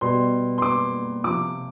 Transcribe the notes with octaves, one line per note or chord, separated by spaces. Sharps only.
B2 G3 C6
C6
D6
C3 F3 D6